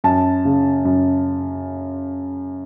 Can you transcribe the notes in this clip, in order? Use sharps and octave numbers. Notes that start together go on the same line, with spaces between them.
F#2 A5
C#3
F#2